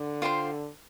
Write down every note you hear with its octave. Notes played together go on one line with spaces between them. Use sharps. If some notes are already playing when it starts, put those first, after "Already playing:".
Already playing: D3
F4 C5 G5 C6